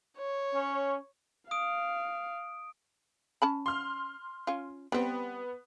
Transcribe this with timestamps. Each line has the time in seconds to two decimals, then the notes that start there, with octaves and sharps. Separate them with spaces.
0.17 C#5
0.54 C#4
1.51 F5 D#6 D7
3.42 C#4 A5 B5
3.66 C6 F6
4.47 C#4 F4
4.92 G3 B3 C4